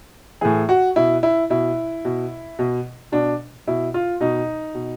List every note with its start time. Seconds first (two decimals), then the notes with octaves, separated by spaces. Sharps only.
0.41 A2 E3 G#4
0.69 F#4
0.96 B2 E4
1.23 E4
1.50 B2 E4
2.05 B2
2.59 B2
3.12 B2 D4
3.67 B2 E4
3.94 F4
4.21 B2 D#4
4.75 B2